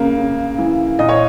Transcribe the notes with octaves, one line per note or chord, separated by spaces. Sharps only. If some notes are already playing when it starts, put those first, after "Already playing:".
Already playing: C#3 A#3
C#3
E3
A#2 D#5
C#5